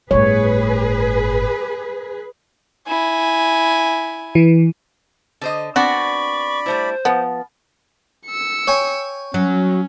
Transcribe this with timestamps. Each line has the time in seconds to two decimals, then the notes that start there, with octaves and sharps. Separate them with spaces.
0.11 G1 A2 G#4 B4 C#5
2.87 E4 G#5
4.35 E3
5.41 D3 C5 D#5
5.76 B3 C4 D4 F#4 D5 B5 C#6
6.66 G3 A3 E4 C5
7.05 F3 B3
8.27 E6 C#7
8.67 C#5 G5 G#5
9.34 F#3 C#4